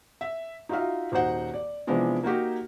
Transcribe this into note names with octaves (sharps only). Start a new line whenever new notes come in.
E5
D#4 F4 F#4 E5 F5
D#1 D#4 F#4 C5 F#5
D5
C3 E3 F3 G#3 B3 D4
A#3 D#4 F#4 G4